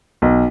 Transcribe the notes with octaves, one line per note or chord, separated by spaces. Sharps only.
B1